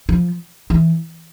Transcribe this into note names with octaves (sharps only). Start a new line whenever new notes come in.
F3
E3